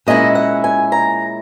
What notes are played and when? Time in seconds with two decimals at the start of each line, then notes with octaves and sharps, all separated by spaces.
0.07 A#2 G#3 C#4 E4 D#5
0.35 F#5
0.64 G#5
0.92 A#5